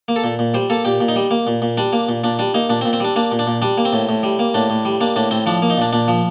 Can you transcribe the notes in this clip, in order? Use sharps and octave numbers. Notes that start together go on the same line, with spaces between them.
A#3
A4
A#2
A#2
G3 C5
A#3 A4
A#2 G4
A#2
D#4
G3
A#3
A#2
A#2
G3 D4
A#3
A#2
A#2 D4
G3 D4
A#3 D#4
A#2 D4
C4
A#2
C4
G3 D4
A#3 D4
A#2
D4
A#2
G3 D4
A#3
C4
A2
A2
G3
A#3
A2 D4
A2
G3
A#3 D4
A2 D4
A2 C4
F3 D4
A#3
D#4
A#2 D4
A#2 D4
F3